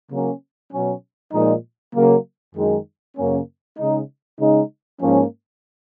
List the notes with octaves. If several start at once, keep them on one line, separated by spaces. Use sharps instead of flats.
C#3 F#3 A#3 C#4
B2 F#3 C#4
A#2 F3 G#3 D#4
C#3 F#3 A#3
F#2 D#3 G#3 D#4
F#2 C#3 F#3 A#3 C#4
C#3 G#3 D#4
C#3 G#3 D#4
G#2 F3 A#3 C#4